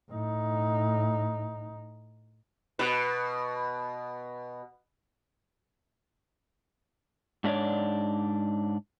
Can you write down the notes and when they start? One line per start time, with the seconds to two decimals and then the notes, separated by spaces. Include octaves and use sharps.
0.11 A2 D#4
2.79 B2 B4
7.44 G#2 D4 E4 C#5 D5